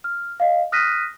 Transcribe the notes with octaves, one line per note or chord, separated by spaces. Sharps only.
F6
D#5 F5
D#6 F6 F#6 A#6 B6 D#7